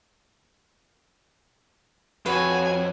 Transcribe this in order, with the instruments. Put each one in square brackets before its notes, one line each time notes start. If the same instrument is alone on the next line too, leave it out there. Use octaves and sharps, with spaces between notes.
[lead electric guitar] F2 [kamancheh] F#4 G#5 [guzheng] B4 C#5